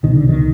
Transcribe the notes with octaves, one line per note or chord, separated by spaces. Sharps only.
C2 B2 D#3
D3
D#3